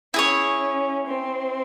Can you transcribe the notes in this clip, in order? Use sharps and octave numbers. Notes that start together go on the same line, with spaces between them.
C#4 E4 G#4 C#5
C4